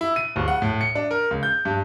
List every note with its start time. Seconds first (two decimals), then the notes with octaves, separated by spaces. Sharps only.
0.01 E4
0.16 D#7
0.36 D1
0.48 F#5
0.62 A2
0.81 C#7
0.95 D4
1.11 A#4
1.31 C#2
1.43 G6
1.65 G2